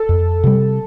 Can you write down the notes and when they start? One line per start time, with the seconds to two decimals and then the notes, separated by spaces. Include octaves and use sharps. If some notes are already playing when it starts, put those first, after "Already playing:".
Already playing: A4
0.09 F2
0.44 C3 G3